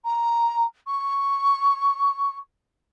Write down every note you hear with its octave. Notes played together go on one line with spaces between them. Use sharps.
A#5
C#6